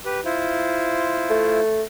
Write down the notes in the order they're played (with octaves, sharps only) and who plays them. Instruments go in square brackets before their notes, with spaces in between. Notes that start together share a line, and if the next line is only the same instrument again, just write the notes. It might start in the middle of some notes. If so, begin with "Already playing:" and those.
[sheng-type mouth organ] G4 B4
E4 F4 C5
[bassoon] A3